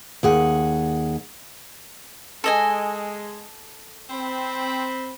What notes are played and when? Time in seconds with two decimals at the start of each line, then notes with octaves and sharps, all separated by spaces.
0.23 D#2 G#4 F#5
2.44 G#3 A4 D#5 G#5
4.10 C4 B5